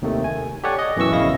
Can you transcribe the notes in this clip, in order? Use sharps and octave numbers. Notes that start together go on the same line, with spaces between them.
D#2 C3 D#3 A3
G#5
G4 A4 C#5 D5 F#5 G#5
D#5
F#2 B2 E3 C#6 E6
A#1 C#3 E4 D#5 F5 A#6